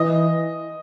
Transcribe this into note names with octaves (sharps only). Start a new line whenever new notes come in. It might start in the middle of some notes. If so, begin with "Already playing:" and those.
Already playing: E3 D#5 D#6